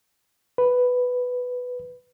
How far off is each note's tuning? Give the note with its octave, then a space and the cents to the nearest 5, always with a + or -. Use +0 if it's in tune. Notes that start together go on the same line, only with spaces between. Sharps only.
B4 +5